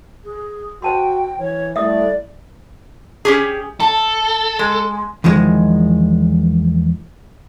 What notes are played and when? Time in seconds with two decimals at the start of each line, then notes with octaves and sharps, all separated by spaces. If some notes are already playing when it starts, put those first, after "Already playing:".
0.24 G#4
0.82 F#4 C5 G5 A5 C6
1.38 E3 C#5
1.76 G3 A3 E4 D5 E5 D#6
3.25 C#4 G4 G#4
3.80 A4 A5
4.59 G#3
5.24 E2 D#3 F3 G#3